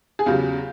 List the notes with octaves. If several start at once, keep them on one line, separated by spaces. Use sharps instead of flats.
G#4
E2 C#3 F#3 F4 G4